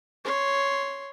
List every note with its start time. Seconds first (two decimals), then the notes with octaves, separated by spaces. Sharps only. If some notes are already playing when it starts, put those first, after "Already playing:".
0.25 C#5 C6